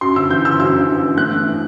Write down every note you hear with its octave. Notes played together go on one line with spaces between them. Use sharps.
F#2 C6
G1 E6
E3 G6
G1 E6
F#2 E6
G1
E3
G1
A2 F#6
A1
E3